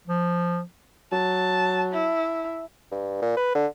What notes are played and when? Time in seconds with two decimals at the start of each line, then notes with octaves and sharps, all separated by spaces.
0.08 F3
1.12 F#3 A5
1.93 E4
2.92 G2
3.22 A#2
3.37 B4
3.55 D3